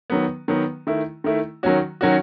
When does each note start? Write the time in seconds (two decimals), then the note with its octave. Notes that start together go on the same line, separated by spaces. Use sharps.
0.10 D#3 F#3 B3
0.48 D#3 F#3 B3
0.87 D#3 A3 E4
1.24 D#3 A3 E4
1.63 D#3 F#3 C#4 F#4
2.01 D#3 F#3 C#4 F#4